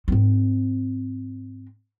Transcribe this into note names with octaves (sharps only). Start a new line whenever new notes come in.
G#2 C4